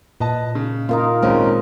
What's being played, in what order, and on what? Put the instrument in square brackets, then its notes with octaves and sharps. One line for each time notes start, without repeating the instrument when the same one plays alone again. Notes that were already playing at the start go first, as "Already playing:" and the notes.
[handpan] A#2 [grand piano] B4 D#5 A5
[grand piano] C#3
[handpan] A#3 A#4 [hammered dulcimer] D#4 F4
[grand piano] G#1 C#4 A#4 [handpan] G#3 A#3 D#4 [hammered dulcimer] C4